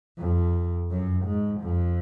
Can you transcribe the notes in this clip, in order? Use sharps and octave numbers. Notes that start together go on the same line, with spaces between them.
F2
F#2
G#2
F2